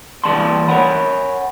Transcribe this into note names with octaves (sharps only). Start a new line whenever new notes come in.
E3 G3 A#3 D5 A5 C6
A#4 C#5 F#5 B5